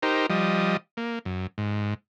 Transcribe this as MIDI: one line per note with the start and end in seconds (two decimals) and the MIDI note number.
0.03 0.26 63
0.03 0.26 67
0.03 0.26 70
0.03 0.26 72
0.30 0.77 53
0.30 0.77 55
0.30 0.77 75
0.97 1.19 58
1.26 1.47 42
1.58 1.94 44